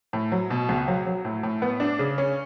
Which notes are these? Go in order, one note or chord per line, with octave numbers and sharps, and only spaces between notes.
A2
F#3
B2
C#2
F#3
F#3
A2
A2
B3
D4
C#3
C#4